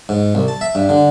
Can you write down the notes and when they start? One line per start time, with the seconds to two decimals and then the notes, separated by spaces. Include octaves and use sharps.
0.09 G#2
0.35 C2
0.48 A5
0.61 E5
0.75 G2
0.89 D3